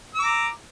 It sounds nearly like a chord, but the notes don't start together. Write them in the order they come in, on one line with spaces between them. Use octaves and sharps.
E6 D6 A#5